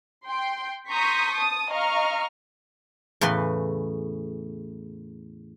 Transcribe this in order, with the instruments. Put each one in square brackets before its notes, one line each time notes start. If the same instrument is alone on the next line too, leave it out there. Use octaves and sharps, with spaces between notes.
[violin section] G5 C6
A#5 C6 C#6 D#6 G6 B6
A5 D#6
D#5 F5 A#5 C#6 F6
[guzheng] E2 A2 C#3 B4 C6